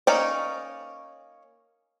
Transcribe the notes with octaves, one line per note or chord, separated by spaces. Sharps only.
A#3 C#4 D#4 D5